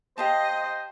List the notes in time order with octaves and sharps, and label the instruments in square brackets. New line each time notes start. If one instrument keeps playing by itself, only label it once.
[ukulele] G4 F5 A5 [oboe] C5 [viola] D#5